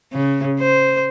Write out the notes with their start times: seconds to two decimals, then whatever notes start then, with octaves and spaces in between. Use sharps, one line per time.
0.13 C#3
0.60 C5